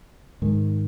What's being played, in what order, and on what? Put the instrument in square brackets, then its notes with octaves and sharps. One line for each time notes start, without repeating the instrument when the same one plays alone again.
[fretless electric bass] G#2 D#3